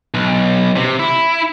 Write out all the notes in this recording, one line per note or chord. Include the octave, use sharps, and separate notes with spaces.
B1
C3
E4